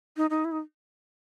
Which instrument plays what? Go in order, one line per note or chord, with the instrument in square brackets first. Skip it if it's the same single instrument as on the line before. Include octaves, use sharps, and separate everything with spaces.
[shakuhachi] D#4
D#4
E4
D#4